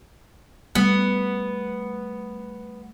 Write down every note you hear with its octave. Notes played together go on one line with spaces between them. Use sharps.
G3 A3 B3